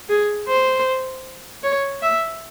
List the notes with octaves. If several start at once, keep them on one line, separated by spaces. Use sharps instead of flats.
G#4
C5
C#5
E5